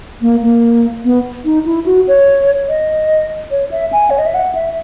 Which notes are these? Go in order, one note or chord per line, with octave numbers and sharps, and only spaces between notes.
A#3
A#3
B3
D#4
E4
F#4
C#5
D#5
C#5
E5
G#5
C#5
D#5
E5
F#5
E5